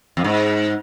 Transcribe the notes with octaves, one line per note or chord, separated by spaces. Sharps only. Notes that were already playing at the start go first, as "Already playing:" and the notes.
F2
G#2